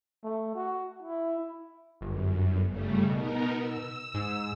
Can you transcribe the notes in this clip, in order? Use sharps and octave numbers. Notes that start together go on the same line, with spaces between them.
A3
F#4
E4
G1 F#2
C#3 G3 A3
B2 B3 D#4 A#4
E6
G#2